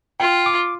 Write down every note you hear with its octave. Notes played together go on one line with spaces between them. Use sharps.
F4 G5
D6